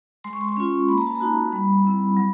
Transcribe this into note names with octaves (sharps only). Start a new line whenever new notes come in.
G#3 C6
C#6
C6
C#6
C#4 F4 C6
A#3 B5
A#5
A5
A#5
D#4 F#4
G3 B5
C4 E4
F#3